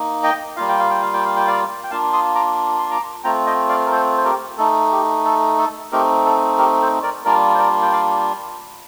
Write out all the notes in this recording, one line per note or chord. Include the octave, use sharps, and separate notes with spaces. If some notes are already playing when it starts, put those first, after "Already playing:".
Already playing: A#3 D#4
D#5 G5
G3 A#3 F4 F5
G5
F5
G5
F5
G5
F5
G5
D5 F5
G5
A#3 D4 F4 F5 A5
C6 D#6
A#5 D6
C6
A#5 D6
A3 C4 F4 G5 A#5
D#5 G5
D5 F5
A#4
A4 C5
C5
G4 A#4
A3 D#4 A4
G4
A4
A4
A3 C4 D#4 G4 A#4
A4
G4 A#4
A4 C5
A#4 D5
G3 A#3 D4 F4 A#4 D5
C5
A#4 D5
G5
D5 F5